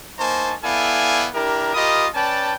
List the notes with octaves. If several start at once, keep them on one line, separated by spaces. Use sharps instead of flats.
A#3 D#4 C5 G#5 A5 C#6
B3 E4 A4 D5 F5 G#5
D4 E4 G4 A#4
F4 G4 A#4 D#5 B5 D#6
C#4 B4 D5 G5 A5